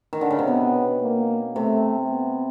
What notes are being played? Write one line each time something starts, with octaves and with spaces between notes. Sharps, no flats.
D#3
D3
C#3
C3
B2 B3
A#3
C3 A3
B3